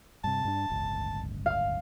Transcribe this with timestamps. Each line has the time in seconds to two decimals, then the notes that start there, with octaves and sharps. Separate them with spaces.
0.24 G2 C3 A5
0.45 G2 D4
0.70 D1 G1 C#2
1.46 F5 F6